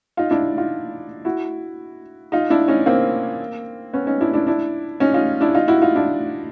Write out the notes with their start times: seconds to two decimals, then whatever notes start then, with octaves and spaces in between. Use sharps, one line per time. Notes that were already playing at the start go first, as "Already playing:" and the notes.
0.17 D#4 F4
0.31 D4 E4
0.58 D#4 F4
1.25 E4 F#4
2.32 D#4 F4
2.50 D4 E4
2.68 C#4 D#4
2.86 A#3 C4
3.93 B3 C#4
4.06 C#4 D#4
4.20 D4 E4
4.34 D4 E4
4.47 D4 E4
5.00 C#4 D#4
5.14 D#4 F4
5.41 D4 E4
5.55 D#4 F4
5.68 E4 F#4
5.82 D#4 F4
5.95 D4 E4